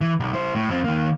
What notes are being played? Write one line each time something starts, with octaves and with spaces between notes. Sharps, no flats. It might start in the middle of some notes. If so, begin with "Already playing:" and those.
E3
B1
E4 C5
A2
F2 C4
D#3 A#3